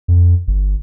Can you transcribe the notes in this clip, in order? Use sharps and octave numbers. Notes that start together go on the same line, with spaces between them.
F2
G1